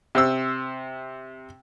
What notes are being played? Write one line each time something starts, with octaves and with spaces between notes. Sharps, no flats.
C3 C5 E6